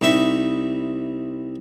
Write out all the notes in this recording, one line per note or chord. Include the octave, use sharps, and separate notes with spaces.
C2 C3 D#4 E5 B5 C#6